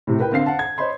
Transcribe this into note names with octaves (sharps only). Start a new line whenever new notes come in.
A2 C3
A#4 B4 G5
D3 C4 F5 C7
F#5 A5
G#6
C5 C#5 D#5 B5 C6